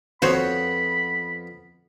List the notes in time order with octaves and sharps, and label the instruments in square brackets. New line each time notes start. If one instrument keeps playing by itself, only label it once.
[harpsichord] F2 B3 [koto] F#4 C5 C#5 [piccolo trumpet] B5